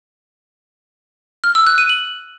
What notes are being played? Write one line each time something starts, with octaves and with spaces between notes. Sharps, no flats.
F6
E6
F#6
D#7
F#7